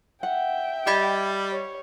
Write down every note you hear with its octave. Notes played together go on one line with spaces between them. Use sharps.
E5 F#5 G5
G3 G4 D#5 B5 A6
C#5